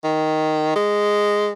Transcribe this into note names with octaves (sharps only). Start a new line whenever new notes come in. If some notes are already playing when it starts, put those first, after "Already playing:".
D#3
G#3